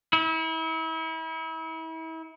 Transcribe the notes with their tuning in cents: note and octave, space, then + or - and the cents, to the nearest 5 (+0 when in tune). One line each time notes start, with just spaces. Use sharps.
E4 -35